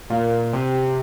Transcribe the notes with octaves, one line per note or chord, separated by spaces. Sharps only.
A#2
C3